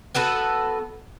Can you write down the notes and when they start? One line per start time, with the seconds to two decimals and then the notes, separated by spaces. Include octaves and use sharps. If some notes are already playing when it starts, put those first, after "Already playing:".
0.15 B3 F#4 A4 B4